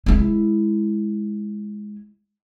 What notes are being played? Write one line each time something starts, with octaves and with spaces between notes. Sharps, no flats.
G#3 E4